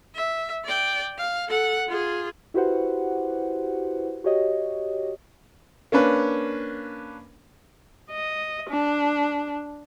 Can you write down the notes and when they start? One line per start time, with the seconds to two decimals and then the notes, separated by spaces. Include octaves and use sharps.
0.15 E5
0.65 D5 G5
1.18 F5
1.48 A4 F#5
1.88 F4 G#4
2.54 E4 F#4 G4 B4 C5 F#5
4.24 F#4 G4 C#5 D#5
5.92 A#3 C#4 D4 B4
8.11 D#5
8.69 D4